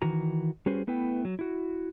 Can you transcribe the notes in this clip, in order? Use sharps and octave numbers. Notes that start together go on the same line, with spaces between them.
D#3 E3 F#4 A#5
G3 C#4 F#4 G#4 B4 C5
A3 B3 E4 B4 G5
F#3
E4 F#4